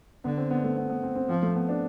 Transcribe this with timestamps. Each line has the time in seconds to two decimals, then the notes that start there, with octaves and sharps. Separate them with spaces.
0.24 D3 B3
0.37 C4
0.51 B3
0.64 A3
0.77 B3
0.90 B3
1.03 C4
1.16 C4
1.29 F3 C4
1.42 A3
1.55 B3
1.69 D4